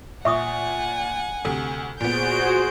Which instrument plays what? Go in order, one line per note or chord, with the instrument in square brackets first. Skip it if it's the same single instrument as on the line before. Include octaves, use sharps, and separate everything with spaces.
[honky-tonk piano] A#2 [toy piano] E5 C#6 D#6 [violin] F#5 G#5
[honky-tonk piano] D2 C3 [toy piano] A4
[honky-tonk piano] A#2 B3 [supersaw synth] F#4 G#4 C5 [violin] G6 D7